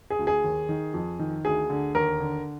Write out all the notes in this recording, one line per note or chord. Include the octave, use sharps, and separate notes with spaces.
G#4
D2
G#4
D#2
D#3
F2
D#3
D2 G#4
D3
D#2 A#4
D3